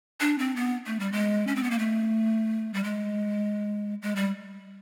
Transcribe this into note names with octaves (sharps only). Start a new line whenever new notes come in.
D4
C4
B3
A3
G3
G#3
C#4
C4
B3
A#3
A3
G3
G#3
G#3
G3